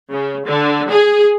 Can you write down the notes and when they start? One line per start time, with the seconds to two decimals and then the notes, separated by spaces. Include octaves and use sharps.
0.12 C#3
0.46 D3
0.89 G#4